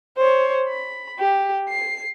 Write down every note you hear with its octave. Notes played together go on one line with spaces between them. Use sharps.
C5 C#5
B5
G4
C7